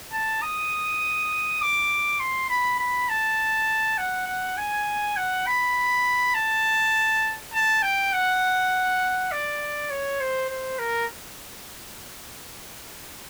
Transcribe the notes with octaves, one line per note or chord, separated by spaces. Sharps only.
A5
D#6
D6
C6
B5
B5
A5
F#5
F#5
G#5
F#5
B5
A5
A5
G5
F#5
D5
C#5
C5
C5
A#4